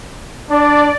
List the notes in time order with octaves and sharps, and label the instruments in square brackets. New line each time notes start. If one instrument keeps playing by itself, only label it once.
[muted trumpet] D4 [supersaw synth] D5